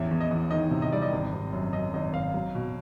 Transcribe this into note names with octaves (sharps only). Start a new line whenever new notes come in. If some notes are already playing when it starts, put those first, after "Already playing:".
Already playing: A1 E2 E5
E2
D#5
E2
D#3 D#5
C3
D#5
G3 D5
D#5
G#1
G#1
F#2
F#2 D#5
G#1 D#5
G#1 F5
F#3
B2